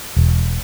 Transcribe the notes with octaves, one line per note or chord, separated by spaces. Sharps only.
E1